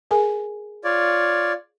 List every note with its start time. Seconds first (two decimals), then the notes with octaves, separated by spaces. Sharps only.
0.11 G#4 A#4 G#5
0.84 F4 C#5 D5